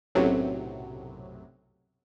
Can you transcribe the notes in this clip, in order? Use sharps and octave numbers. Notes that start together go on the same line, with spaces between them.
B1 F#2 A2 C3 F#3